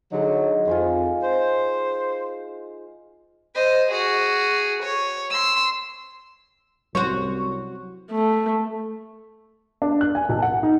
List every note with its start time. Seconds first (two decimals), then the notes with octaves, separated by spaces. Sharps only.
0.12 D3 F#3 G#3 D#4
0.67 F2 F4 G#5 C6
1.23 C5
3.55 C5 D#5
3.90 F#4 G#4
4.83 C#5
5.30 C6 E6
6.95 C2 F#3 F#4 C5 C#5 C#6
8.11 A3
9.82 D4
10.01 F#6
10.15 G#5
10.29 B1
10.42 F#5
10.63 D#4